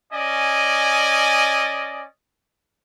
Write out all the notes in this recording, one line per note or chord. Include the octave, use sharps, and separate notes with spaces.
C#4 D5 D#5 G#5